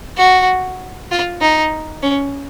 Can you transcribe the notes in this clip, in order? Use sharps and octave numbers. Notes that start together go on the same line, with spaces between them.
F#4
F4
D#4
C#4